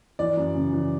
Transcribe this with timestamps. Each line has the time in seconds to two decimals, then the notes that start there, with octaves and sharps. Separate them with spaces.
0.19 E3 D5
0.37 F#2
0.55 C#3
0.72 E3